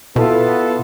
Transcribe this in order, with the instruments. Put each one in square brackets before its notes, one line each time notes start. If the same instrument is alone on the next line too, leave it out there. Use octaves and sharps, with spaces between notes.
[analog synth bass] B2 [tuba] B3 [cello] E4 F4 [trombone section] A4